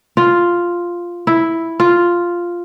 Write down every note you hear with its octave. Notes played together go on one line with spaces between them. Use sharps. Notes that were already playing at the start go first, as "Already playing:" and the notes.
F4
E4
F4